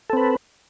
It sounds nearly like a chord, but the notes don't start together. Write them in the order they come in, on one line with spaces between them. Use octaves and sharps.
A4 C4 B4